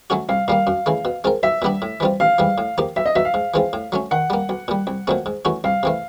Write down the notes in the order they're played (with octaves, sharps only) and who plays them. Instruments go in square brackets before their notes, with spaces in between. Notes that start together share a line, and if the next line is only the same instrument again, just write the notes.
[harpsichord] F#3 A3 C#4 F#4
[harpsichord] C2 [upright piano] F5
[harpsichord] A#2 G3 A#3 [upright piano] F5
[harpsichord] F#2
C#3 E3 A3
B2
G#3 C4 F4 A#4
[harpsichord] B1 [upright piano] E5
[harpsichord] A#2 G3 B3 D4
A2
E3 G3 C4 F4
[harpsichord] A1 [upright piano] F5
[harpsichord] G#2 E3 G3
A2
F3 A#3 D#4 G4
[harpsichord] B1 [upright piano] E5
[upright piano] D#5
[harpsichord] B2 F#3 [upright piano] E5
[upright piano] F5
[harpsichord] G#2
E3 G#3 C4 F4
A2
F#3 A3 C#4
[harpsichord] D#3 [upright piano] F#5
[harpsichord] G3 A#3
B1
A#2 G3
C2
A#2 F#3 A3 C4
G#2
E3 A3 C#4 F#4
[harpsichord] C2 [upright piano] F5
[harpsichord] C3 E3 A3